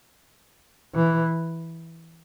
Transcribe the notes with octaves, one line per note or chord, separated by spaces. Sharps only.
E3